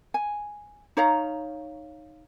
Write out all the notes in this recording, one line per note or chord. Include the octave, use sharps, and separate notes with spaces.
G#5
D#4 C#5 F5 A#5